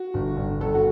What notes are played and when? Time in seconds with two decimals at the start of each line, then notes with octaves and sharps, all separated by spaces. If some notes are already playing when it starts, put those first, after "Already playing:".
Already playing: F#4
0.14 G1
0.37 G1
0.60 G1 A4
0.75 F#4